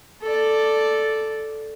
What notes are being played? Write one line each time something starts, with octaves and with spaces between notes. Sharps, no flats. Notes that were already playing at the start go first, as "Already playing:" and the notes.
A4 D5